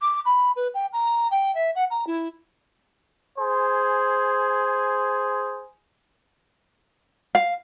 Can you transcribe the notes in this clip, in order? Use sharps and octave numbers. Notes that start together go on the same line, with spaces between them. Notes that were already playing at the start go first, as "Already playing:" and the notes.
D6
B5
B4
G5
A#5
G5
E5
F#5
A#5
E4
G#4 C5 G#5
F5